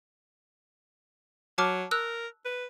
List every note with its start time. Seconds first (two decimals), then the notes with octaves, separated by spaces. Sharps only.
1.58 F#3 A5 D6 F6
1.91 A#4 E6 F#6
2.45 B4